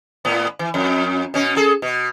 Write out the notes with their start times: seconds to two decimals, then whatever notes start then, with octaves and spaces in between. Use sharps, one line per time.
0.25 A2 B3
0.59 E3
0.74 F2
1.34 B2 C#4
1.56 G#4 A4
1.82 B2